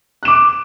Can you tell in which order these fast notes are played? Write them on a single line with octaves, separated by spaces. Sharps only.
F#6 E7 D6